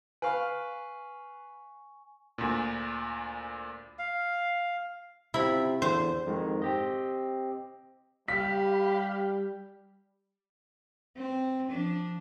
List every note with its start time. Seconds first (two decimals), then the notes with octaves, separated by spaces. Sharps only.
0.22 B4 F5 G#5 C#6
2.38 D2 A#2
3.99 F5
5.34 C3 C4 E4 F4 B5
5.82 E2 D3 C5
6.26 F2 G#2 D#3
6.62 C4 G4 D#5
8.28 G3 G4 F5 B5 B6
11.16 C4
11.70 F3 D4